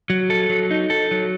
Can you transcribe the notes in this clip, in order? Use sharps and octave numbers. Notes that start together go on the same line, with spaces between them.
F#3
A4
F#3
D#4
A4
F#3